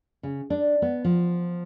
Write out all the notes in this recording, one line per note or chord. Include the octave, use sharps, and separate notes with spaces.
C#3
D4
B3
F3